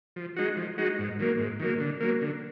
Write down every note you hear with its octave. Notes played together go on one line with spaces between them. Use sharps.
F3
G#3 D#4 F#4
F3
G#3 D#4 F#4
G#2
D#3 F#3 A#3
G#2
D#3 F#3 A#3
D3
F#3 A#3
D3